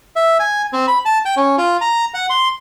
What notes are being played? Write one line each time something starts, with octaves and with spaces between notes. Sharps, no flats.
E5
G#5
C4
B5
A5
G5
C#4
F4
A#5
F#5
C6